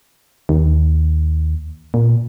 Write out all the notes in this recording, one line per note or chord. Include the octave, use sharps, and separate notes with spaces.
D#2
A#2